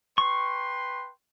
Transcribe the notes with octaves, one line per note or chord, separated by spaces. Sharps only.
B4 G5 C6 C#6